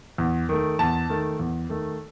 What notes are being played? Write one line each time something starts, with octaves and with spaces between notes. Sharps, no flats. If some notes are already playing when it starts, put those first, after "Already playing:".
E2
D#3 A3
E2 A5
D#3 A3
E2
D#3 A3